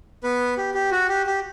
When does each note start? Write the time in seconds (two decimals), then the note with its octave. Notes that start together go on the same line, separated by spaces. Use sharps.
0.23 B3 B4
0.57 G4
0.74 G4
0.91 F#4
1.09 G4
1.26 G4